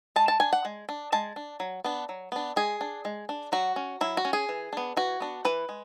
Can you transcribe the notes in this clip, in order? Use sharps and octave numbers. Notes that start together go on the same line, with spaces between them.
G#3 A5
A5
D4 G#5
F#5
G#3
D4
G#3 A5
D4
F#3
B3 D4
F#3
B3 D4
G#3 G#4
D4
G#3
D4
F#3 F#4
C#4
F#3 E4
F#4
C#4
G#4
E3
B3 D4
E3 F#4
B3 D4
E3 B4
G#3